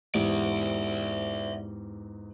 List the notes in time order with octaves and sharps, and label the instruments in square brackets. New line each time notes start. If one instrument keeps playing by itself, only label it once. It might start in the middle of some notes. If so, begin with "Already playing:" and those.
[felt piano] E2 G#2 G4 [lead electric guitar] D5 E5